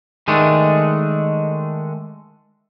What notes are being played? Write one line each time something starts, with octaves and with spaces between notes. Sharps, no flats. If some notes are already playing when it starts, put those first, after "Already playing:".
D#3 G#3 A3 D4